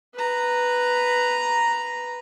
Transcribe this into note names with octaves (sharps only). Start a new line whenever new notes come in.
B4 A#5